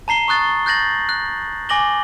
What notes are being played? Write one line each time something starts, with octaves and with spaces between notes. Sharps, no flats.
A5 A#5 C7 G7
C#6 D#6 F#6 A6
F#6 G6 A6 A#6 F#7
F#6
G#5 D6 A#6 F#7 G7